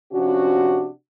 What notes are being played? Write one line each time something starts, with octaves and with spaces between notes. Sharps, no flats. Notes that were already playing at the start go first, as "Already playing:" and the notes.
C3 F3 C#4 D4 F#4